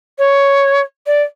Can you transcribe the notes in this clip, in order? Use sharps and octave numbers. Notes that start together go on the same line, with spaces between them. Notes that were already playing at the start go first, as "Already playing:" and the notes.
C#5
D5